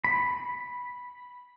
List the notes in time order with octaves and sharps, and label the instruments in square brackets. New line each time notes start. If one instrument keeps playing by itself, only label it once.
[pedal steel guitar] B5